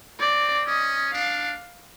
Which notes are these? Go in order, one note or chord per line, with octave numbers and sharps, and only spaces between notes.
C4 D5
C#4 D#5
D4 F5